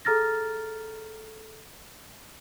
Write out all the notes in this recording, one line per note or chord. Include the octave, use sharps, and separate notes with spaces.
G#4 A4 A#5 F6 A6 A#6